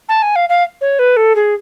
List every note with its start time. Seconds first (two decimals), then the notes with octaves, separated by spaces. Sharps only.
0.09 A5
0.22 G#5
0.36 F5
0.49 F5
0.81 C#5
0.99 B4
1.17 A4
1.35 G#4